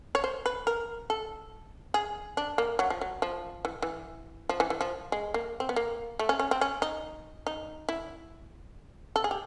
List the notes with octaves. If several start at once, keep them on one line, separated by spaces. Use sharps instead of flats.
C#5
C5
B4
A#4
A4
G#4
D4
A#3
F#3
F3
F#3
F3
E3
E3
F3
E3
E3
F3
G#3
A#3
C4
B3
A#3
A3
C#4
C#4
C4
C#4
D#4
D#4
E4
A4
G#4
G4